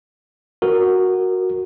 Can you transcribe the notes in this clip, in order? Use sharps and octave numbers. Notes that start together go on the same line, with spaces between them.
F#4 A#4